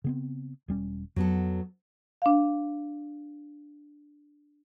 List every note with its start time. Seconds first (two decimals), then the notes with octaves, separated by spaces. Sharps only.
0.04 C#3 B3 C4
0.68 E1 G3 C#4
1.16 F2 F#3 B3 A4
2.22 D4 F5